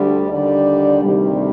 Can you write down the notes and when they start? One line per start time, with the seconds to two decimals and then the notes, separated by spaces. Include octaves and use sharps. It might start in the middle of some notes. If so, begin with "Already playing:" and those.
Already playing: D2 D3 G3
0.29 D#2 D3 G3 D5
1.03 D2 C3 D#3 G3